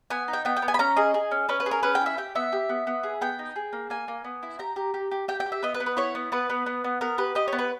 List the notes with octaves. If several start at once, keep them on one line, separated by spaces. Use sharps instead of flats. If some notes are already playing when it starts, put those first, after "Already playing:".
B3 G#5
D#4
G5
B3 G5
G5
B3
G#5
B5
C#4 A#5
G#4 D#5
G#4
C#4
C#4 B4
B4
G#4
A#4
C#4 B4
G5
E4 E5
G4 G5
B3 E5
G4
B3
B3
G#4
B3 G5
D#4
G#4
A#3
A#3 G#5
A#3
B3
E4
G4 A#5
G4
G4
G4
G4 G5
G5
G4
E5
B3 D#5
B4
B3
B4
E4 C#5
B3
B3 B4
B3
B3
B3
B3 A#4
G4 B4
G4 D#5
B3 C#5
B4